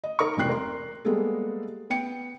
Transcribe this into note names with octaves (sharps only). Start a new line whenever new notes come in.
D#5
D#4 A#4 C#6
E1 C3 E3 G5 F#6 C7
A#4 C6
G3 G#3 A#3 B3 G#4 A4
B3 G5 C#7